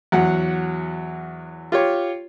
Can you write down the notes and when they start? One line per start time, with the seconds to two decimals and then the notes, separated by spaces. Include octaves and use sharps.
0.12 E2 F#3 F#5
1.72 F4 G4 C#5